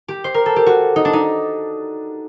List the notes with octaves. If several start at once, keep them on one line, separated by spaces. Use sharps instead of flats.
G4
C5
A#4
A4
G4
F#4
D#4
D4
D#4